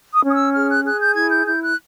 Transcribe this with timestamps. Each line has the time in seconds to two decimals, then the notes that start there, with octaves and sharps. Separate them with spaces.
0.13 D#6
0.23 C#4
0.29 D#6
0.33 E6
0.54 G#4 F6
0.69 F#6
0.85 G#4 F#6
1.00 G6
1.15 E4 G#6
1.30 G6
1.46 E4 G6
1.61 F#6